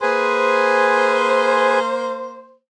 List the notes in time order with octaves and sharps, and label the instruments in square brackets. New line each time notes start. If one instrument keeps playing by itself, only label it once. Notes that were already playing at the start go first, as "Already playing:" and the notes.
[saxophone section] A#3 C5 [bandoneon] G#4 B4 G#5